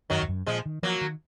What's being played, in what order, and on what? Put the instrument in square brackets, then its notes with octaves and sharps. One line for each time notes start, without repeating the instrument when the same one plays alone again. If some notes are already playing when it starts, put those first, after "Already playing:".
[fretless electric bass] F#2 [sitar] D#3 F#3
[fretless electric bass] F2
F#2
[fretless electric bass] A#2 [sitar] F3 G#3
[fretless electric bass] D#3
[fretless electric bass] F3 [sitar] F#3 A#3
[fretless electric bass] D#3